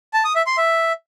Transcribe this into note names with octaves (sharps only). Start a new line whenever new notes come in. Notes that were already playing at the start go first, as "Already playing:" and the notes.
A5
D#6
E5
C6
E5